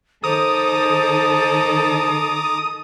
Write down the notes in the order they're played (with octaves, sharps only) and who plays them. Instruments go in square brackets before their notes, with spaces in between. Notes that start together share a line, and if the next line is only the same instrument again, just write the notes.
[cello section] D#3 A4 [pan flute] C5 [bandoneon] A#5 D6 [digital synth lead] D#6